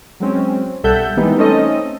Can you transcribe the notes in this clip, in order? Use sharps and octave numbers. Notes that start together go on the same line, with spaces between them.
F#3 G#3 C4 C#4
B1 G3 A4 E5 F#5 G6
E3 G3 G#3 A#3 B3 D#4
A3 C4 C#4 D#4 A4 D#5